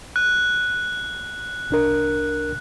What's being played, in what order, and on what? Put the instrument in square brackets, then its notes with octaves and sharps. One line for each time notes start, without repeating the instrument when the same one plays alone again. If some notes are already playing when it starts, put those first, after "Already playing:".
[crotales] F#6
[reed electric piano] C2 D4 A#4